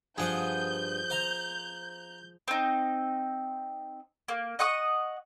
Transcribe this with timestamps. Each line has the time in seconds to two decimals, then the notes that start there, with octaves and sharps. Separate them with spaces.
0.18 G2 F3 G#4 F#5 D#6 G6
1.10 C5 F5 A#5
2.48 C4 D#4
4.28 A#3
4.59 D#5 F#5 C#6 D#6